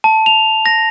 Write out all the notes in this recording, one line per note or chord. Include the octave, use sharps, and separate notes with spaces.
A5
F7
A#6